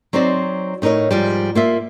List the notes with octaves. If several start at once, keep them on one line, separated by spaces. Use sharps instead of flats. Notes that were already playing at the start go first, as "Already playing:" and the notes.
F#3 C4 D#4 C5 D5
A2 D#4 A#4 C#5 D#5
G#2 F3 G3
A#3 F4 E5